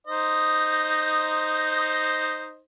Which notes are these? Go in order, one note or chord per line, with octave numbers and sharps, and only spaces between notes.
D#4 C5 D#5